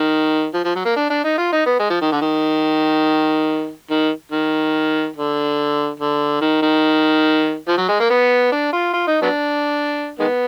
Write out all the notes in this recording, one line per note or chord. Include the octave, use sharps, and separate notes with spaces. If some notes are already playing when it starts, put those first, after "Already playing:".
Already playing: D#3
F3
F3
F#3
A#3
D4
D4
D#4
F4
D#4
B3
G#3
F3
D#3
D3
D#3
D#3
D#3
D3
D3
D#3
D#3
F3
F#3
G#3
A#3
B3
D4
F4
F4
D#4
F#3 B3 D4
D#3 G#3 B3